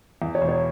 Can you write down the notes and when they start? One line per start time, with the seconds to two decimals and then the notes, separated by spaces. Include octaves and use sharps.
0.22 E2
0.35 C#5
0.42 E1
0.49 C#5